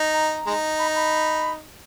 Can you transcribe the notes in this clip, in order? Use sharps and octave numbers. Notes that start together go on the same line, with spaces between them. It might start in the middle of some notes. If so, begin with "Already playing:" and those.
Already playing: D#4
A#5
G#3 D#4
B5
A#5
B5